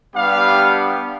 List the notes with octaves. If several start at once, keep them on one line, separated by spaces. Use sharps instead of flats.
G3 B3 D4 G4 F5